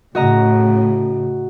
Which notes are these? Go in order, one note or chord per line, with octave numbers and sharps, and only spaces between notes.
A2 C#3 F#4 D#5 A#5